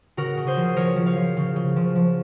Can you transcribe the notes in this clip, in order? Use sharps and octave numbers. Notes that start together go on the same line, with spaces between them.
C#3 F#4 A#4
C#3
G#4 C5
F3
F3 A#4 C#5
F3
C#5 F5
F3
C#3
C#3
F3
F3